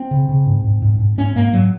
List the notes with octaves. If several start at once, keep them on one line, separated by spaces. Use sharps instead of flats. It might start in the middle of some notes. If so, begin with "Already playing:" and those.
Already playing: C4
C#3
C#3
G#2
G#2
G#2
G#2
G#2 C#4
G#2 A#3
G#2 F#3